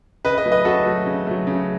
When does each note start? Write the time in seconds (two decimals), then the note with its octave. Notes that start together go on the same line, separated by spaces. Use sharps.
0.25 C#3 B4 D#5
0.38 B4 D#5
0.45 F#3 A3
0.52 B4 D#5
0.65 C#3 F#4 A4
0.86 F#3 A3
1.06 C#3
1.27 F#3 A3
1.47 C#3